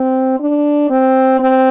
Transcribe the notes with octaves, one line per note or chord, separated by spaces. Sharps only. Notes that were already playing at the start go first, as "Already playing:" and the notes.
Already playing: C4
D4
C4
C4